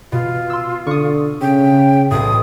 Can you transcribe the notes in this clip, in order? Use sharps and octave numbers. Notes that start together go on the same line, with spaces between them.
B2 F4
C6 E6
D3 C#6 D#6
C#3 G5
B1 A2 D#6